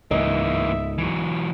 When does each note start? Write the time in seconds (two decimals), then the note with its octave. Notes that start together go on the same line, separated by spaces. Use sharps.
0.11 C#2 G#2 E3 A#3 D#5 E5
0.98 E3 F#3